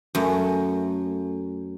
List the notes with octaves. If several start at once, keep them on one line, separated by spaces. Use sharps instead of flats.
F#2 A3